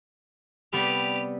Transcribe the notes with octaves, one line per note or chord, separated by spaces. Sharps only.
C3 G3 B3 G4 B4 F7